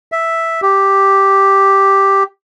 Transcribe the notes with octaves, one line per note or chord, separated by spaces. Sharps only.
E5
G4